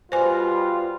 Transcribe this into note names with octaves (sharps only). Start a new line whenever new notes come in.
B2 G3 F4 B4 C5 G#5